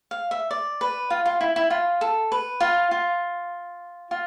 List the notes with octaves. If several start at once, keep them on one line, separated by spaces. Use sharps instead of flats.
F5
E5
D5
B4
F4
F4
E4
E4
F4
A4
B4
F4
F4
F4